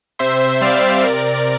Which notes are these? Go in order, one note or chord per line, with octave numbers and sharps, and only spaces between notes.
C3 C5 E5
G3 D5 F5
C3 A#4 D5